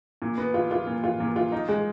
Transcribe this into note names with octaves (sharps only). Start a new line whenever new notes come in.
A#2
B3
F4
F4
A#2
F4
A#2
F4
D#4
G#3